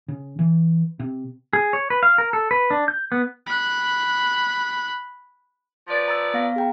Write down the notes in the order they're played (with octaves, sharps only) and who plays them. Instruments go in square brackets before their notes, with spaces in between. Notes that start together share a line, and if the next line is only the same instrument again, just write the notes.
[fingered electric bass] C#3
E3
C3
[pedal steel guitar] G#4
C#5
B4
F5
A#4
A4
B4
D4
G6
B3
[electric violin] B5 F#6
[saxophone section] F3 B4 D5 [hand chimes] A6
[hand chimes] A#5 E6
B3 F5 A#6
G#4 G5 A#5